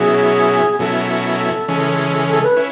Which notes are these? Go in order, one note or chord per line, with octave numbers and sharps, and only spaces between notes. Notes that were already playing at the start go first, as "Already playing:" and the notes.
Already playing: B2 F#3 C#4 E4 G#4
B2 F#3 C#4 E4 A4
C#3 E3 G#3 C#4
A4
B4
C#4 E4